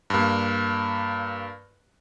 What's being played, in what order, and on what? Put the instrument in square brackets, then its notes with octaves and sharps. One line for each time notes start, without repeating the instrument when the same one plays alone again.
[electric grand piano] G2 A#3